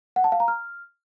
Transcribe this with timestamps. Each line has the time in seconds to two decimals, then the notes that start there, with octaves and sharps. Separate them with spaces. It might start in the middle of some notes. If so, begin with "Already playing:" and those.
0.16 F#5
0.24 A5
0.32 F5
0.40 A#5
0.48 F6